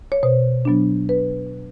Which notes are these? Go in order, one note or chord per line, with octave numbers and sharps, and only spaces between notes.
C#5
B2 C5
F#3 B3 D4
B2 B4